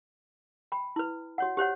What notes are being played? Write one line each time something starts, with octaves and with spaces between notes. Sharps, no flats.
G5 B5
E4 B4
F#4 C#5 F#5
G4 C5 C#5 F#5